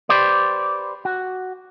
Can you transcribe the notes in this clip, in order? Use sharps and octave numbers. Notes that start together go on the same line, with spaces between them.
G4 B4 C5 D5
F#4